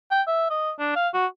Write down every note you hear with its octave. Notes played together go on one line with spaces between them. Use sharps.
G5
E5
D#5
D4
F5
F#4